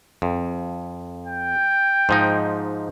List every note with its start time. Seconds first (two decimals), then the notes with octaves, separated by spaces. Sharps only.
0.22 F2
1.27 G5
2.09 G#2 F3 D#4